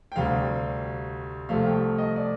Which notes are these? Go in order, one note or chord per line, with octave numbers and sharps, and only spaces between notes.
G5
D2 C3 G3 F5
C2 C3 F3 A3 F5
G5
D#5
D5